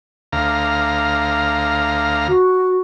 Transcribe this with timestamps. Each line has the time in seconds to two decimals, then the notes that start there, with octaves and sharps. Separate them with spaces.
0.33 D2 F5 A#5
2.28 F#4